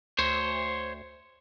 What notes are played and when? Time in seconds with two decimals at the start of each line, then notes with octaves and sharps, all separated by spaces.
0.19 D2 C5 C#5